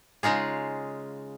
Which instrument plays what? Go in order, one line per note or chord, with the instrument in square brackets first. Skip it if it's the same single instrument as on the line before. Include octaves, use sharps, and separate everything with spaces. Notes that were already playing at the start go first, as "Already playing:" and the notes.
[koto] C#3 G#3 D#4 F4 G#4